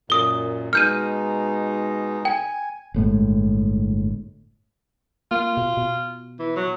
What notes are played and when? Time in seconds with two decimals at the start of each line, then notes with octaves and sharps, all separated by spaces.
0.10 F#2 A#2 D#6 G7
0.73 B2 G#3 D#4 F6 G6 D#7
2.25 G5 G#5
2.94 G1 A2 G#3
5.31 A#3 F4
5.57 B2
5.77 B2
6.39 E3
6.56 F#3